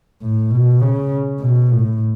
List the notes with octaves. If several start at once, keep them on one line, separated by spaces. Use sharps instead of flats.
A2
B2
C#3
B2
A2